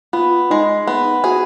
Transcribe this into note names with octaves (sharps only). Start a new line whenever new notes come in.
B3 F4
G#3 D#4
B3
F#4 G#4